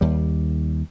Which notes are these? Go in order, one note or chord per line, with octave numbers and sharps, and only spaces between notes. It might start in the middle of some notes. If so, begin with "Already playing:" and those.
D#2 G3